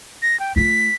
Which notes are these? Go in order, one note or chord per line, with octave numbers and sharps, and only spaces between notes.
A#6
G5
A3 F4 B6